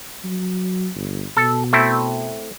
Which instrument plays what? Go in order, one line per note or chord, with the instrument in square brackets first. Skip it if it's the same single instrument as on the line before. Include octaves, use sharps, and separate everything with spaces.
[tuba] F#3
G1
[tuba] B2 [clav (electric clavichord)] A4
[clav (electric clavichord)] A3 C4 E4